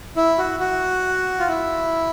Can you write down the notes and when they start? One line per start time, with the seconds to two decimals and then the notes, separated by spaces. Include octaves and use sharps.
0.16 E4
0.38 F#4
0.60 F#4
1.40 F4
1.48 E4